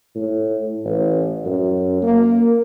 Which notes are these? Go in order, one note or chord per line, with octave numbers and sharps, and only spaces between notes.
A2
A1
F#2
A#3